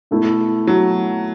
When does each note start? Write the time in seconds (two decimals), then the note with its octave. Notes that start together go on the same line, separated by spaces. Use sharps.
0.11 B2 A3 E4
0.67 F#3